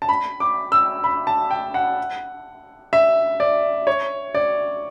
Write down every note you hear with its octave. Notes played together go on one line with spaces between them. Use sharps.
A5
B5
D6
E6
B5
A5
G5
F#5
E5
D5
C#5
D5